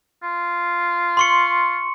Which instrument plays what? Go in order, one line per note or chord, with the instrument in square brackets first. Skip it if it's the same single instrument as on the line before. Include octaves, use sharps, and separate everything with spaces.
[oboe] F4
[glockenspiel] C6 C#6 C#7